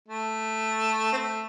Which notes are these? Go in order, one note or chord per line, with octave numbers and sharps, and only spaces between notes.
A3
C4
A3